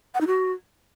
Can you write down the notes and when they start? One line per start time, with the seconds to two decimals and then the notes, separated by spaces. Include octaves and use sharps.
0.15 F#5
0.21 D#4
0.27 F#4